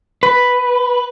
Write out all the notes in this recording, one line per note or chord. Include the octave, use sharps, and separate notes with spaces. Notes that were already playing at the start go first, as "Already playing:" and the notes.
B4